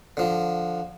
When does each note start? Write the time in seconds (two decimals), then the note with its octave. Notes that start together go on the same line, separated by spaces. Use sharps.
0.17 D3 F3